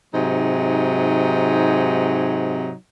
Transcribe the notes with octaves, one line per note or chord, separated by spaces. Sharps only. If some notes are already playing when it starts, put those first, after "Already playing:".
G#2 C3 F#3 D#4